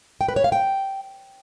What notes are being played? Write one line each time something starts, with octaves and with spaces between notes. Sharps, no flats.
G5
B4
C#5
F5
G5